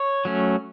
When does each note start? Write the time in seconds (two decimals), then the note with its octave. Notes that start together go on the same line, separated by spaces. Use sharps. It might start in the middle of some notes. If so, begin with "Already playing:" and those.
Already playing: C#5
0.25 F#3 A3 C#4